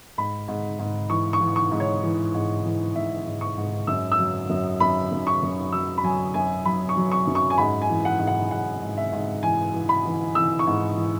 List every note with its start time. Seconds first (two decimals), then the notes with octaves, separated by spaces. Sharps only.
0.18 G#2 B5
0.48 G#2
0.79 G#2
1.10 E3 C#6
1.33 C#6
1.40 E3
1.56 C#6
1.72 G#2
1.80 C#5
2.03 E3
2.34 G#2
2.65 E3
2.95 G#2 E5
3.26 G#2
3.41 C#6
3.57 G#2
3.87 F#2 E6
4.12 E6
4.19 F#3
4.50 F#2
4.80 F#2 B5
5.12 F#2
5.27 C#6
5.43 F#2
5.72 F#3 E6
5.98 B5
6.04 F#3 G#5
6.34 F#2 G#5
6.65 F#3 B5
6.89 C#6
6.97 F#3
7.12 C#6
7.27 F#2
7.35 C#6
7.50 G#5
7.58 G#2 B5
7.82 G#5
7.89 E3
8.05 F#5
8.20 G#2
8.27 F#5
8.50 G#2 F#5
8.82 G#2
8.97 E5
9.13 G#2
9.43 E3 G#5
9.74 E3
9.89 B5
10.05 E3
10.35 E3 E6
10.59 C#6
10.67 G#2
10.97 E3